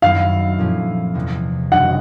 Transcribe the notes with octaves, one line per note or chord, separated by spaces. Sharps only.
F#2 D#3 F#3 B3 E4 F5
A#2 F3 A3 C#4 E4
E2 C3 F3 G#3 B3
F#1 F#2 D#3 G#3 F#5